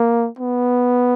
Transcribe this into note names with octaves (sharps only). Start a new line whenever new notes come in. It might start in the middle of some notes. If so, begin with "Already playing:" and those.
Already playing: A#3
B3